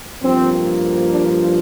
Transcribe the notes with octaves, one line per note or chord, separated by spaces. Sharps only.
G2 F3 A#3 C4
D4